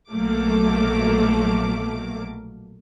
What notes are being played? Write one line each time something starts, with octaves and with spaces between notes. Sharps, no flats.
A#1 B2 F#3 A3 A#3 D6